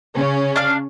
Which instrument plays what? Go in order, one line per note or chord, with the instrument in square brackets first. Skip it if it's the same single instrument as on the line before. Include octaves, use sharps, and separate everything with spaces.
[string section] C#3 C#4
[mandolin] D4 F5